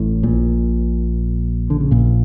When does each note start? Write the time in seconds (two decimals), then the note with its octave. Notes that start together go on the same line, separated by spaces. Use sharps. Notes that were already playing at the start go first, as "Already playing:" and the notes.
Already playing: A1 A2
0.23 A#1 A#2
1.70 D3
1.81 C#3
1.91 A#1 A#2